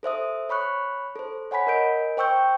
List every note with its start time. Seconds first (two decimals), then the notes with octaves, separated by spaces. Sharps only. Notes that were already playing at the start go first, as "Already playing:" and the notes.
0.03 A4 C5 E5 D#6
0.49 C#5 B5 C#6 F#6
1.16 A4 C5
1.51 C#5 F#5 G#5 B5 B6
1.67 A#4 D#5 G6 D7
2.17 C5 G5 C#6 E6 G6